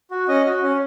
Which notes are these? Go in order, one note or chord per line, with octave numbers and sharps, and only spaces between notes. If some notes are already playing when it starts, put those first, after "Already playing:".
F#4
C#4 D#5
F#4
C#4